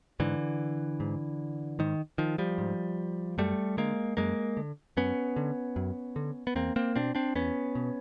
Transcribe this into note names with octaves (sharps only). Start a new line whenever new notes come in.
G#2 D3 E3
G#2
G#2 D#3
D#3 F3
F3 G3
G#2
F#2 G3 A3
D3 G#3 A#3
F#2 G#3 A#3
D3
F#2 B3 C#4
D3
F#2
D3
B3
E2 A#3 C4
A#3 C4
B2 C4 D4
C4 D4
E2 B3 C#4
B2